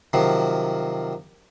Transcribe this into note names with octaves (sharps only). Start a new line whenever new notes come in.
C3 D#3 F3 F#3